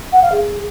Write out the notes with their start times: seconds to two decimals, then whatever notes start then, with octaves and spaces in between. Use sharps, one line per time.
0.12 F#5
0.22 F5
0.32 G#4